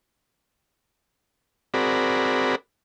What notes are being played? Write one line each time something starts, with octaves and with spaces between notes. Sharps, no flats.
C4 F#4 G#4 A#4 D5 B5